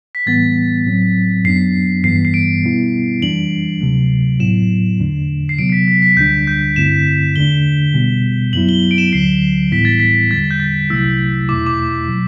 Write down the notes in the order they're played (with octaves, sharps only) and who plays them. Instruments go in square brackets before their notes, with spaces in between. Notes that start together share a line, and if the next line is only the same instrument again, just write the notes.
[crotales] B6
[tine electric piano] A2 E3 G3 B3 [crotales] A6
[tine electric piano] A2 F#3 C4
[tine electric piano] F#2 F#3 B3 D4 [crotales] C7
[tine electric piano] G2 E3 G3 B3 [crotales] C7
[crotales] C7
D7
[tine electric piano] B2 G3 B3 E4
[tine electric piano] F#2 E3 G3 D4 [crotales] F#7
[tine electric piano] D2 C3 F#3 A3
[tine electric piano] A2 F#3 B3 E4 [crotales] E7
[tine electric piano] E2 D3 A3 D4
[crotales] C7
[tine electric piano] C3 F#3 B3 [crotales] D7
[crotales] C7
B6
B6
B6
[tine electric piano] D2 D3 G3 D4 [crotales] G6
[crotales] G6
[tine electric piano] G2 D3 A3 C4 E4 [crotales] E7
[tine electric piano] E2 D3 A3 D4 [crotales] G7
[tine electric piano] B2 G3 B3
[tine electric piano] F#2 F#3 B3 E4 [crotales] F#7
[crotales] G7
F#7
D7
E7
[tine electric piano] D2 D3 F#3 [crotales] C7
[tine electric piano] A2 E3 G3 B3 E4 [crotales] B6
[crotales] A6
B6
[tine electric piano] E2 D3 G3 [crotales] A6
[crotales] G6
A6
[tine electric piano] C2 C3 F#3 A3 E4 [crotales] E6
[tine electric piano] E2 B2 A3 E4 [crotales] D6
[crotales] D6
[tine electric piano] B2 F#3